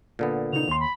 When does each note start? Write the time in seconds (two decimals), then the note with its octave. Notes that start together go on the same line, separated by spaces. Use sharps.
0.19 A#2 D3 B3
0.53 C#3 D#4 F7
0.68 D#2 C6
0.80 B5